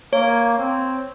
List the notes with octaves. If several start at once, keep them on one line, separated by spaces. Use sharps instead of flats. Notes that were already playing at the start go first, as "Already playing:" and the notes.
A#3 C#5
C4